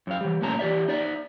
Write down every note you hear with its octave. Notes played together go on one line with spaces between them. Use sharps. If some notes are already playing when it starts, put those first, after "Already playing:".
F#2 F5
E3 G3
G2 A#2 A3 C#4 A5 A#5
E3 G4 D5 E5
D#4 D5 E5